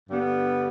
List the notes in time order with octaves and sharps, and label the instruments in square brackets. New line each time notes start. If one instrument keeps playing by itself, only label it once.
[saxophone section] G2 D3 G3 B3